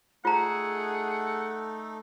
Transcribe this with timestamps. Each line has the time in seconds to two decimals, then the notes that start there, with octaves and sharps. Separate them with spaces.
0.25 A3 D#4 F4 G#4 A4 F#5 A#5